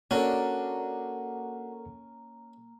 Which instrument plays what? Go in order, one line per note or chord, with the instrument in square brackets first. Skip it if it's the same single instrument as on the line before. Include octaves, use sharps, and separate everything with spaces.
[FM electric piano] A#3 A#5 [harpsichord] C#4 [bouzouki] D4 F#4 [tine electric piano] A4 A#4 F#5